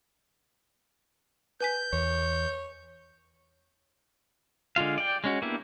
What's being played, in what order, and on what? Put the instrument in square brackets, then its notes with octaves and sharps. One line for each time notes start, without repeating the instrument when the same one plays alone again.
[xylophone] B4 G#5 B6 [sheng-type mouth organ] G6
[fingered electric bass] E2 [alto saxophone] C#5
[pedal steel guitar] D3 G#3 F4 F5
D5 G5
G#3 C#4 F#4
A#3 B3 D4 E4 G4